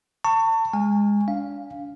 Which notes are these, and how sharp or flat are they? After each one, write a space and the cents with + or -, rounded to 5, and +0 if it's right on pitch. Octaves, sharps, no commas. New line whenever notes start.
A5 +35 C#6 +5
G#3 -15 G#5 -20
D4 -35 F5 +0